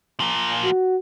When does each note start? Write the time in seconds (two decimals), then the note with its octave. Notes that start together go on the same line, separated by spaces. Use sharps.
0.20 F3 A#3
0.64 F#4